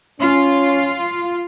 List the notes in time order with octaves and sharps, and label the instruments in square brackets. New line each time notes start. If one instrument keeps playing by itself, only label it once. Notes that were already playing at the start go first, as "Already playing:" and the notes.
[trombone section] C#4 [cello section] F4